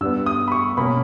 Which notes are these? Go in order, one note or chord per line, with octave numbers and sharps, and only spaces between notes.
G2 G3 B3 E6
D#6
B5
C#6
B2 A#3 C#4 B5